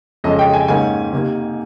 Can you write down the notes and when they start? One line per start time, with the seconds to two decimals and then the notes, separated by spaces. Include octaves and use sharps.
0.24 F2 C#3 G#3 C#4 D#5
0.39 G5
0.54 G#5
0.68 G#2 D#3 A#3 C#4 G#5
1.13 C3 D#3 A#3